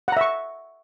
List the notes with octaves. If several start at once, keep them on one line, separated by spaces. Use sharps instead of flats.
E5 F#5 A#5 C#6